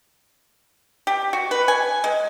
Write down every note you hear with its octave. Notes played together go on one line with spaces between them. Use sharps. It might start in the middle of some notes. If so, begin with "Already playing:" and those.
G4
F#4
B4
G#5
G#3